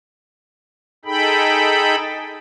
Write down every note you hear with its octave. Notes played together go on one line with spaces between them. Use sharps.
D#4 G#4 A4 G5 B5